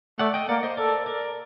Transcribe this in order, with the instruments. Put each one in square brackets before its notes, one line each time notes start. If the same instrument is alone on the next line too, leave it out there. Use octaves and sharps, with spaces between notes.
[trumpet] A3 [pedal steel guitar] D5 F#5
[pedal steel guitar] D#5 G5
[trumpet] A#3 [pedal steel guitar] D5 F#5
[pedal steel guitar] C5 D#5
[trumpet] A4 [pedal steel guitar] A#4 D5
[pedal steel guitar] A#4 D5